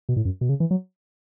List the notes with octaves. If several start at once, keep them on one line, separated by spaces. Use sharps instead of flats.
B2
A2
F#2
B2
C#3
E3
F#3